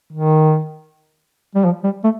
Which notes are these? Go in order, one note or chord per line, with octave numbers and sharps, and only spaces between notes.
D#3
G3
F3
G3
A3